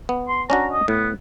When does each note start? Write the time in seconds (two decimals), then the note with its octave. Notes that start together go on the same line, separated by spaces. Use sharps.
0.09 B3
0.28 C6
0.50 C#4 D4 F#4 A#5
0.72 D#5
0.88 A2 B3